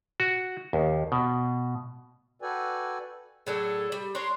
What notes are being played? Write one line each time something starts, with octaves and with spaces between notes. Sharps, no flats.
F#4
D#2
B2
F#4 A4 B4 D5 G5 G#5
A2 F#3 D4 G#4 A4
G3
D4 A#4 C#5 C6